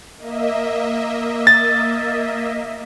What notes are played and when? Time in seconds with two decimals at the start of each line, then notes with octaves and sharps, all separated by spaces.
0.17 A#3 D#5 E5
1.47 A6